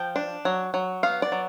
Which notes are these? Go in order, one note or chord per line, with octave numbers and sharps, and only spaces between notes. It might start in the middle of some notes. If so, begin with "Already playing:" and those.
Already playing: F3 G5
D4
F#3
F#3
B3 F5
D5
F#3